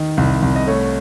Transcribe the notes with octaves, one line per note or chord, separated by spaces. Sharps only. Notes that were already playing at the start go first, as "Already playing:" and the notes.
Already playing: D#3 D#5
C2
C2
D#5
A3 C#5